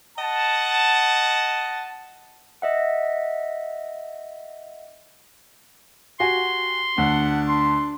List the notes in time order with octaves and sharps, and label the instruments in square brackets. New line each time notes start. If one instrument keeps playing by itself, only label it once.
[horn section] D#5 F#5 A5
[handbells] D#5 E5 F#5
[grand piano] F#4 G4 G#5 [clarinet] C6
[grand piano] D2 [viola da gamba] D4 [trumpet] F#5
[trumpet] C6